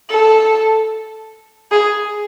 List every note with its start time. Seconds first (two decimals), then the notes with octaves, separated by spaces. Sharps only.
0.10 A4
1.72 G#4